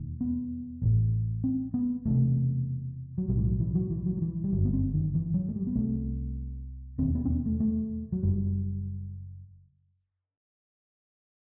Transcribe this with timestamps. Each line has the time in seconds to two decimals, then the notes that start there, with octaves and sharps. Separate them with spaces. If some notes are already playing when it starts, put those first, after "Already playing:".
Already playing: E1 D#2
0.21 B3
0.82 A1 A2
1.44 C4
1.74 B3
2.06 E1 E2 C3 A3
3.18 F#3
3.28 B1 G3
3.33 A2 E3
3.45 F#3
3.60 E3
3.75 F#3
3.91 E3
4.06 F#3
4.17 F#3
4.22 E3
4.44 G3
4.52 G1 F#2 F#3
4.65 B3
4.73 C4
4.94 D#3
5.15 E3
5.34 F#3
5.48 A3
5.56 G3
5.67 B3
5.76 C2 C3 A3
6.98 E1 D#2 C4
7.15 B3
7.25 C4
7.30 B3
7.46 A3
7.60 A3
8.12 F#3
8.23 F#1 F#2 G3